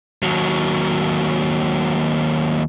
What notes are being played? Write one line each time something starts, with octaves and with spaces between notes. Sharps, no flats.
D#2 F#3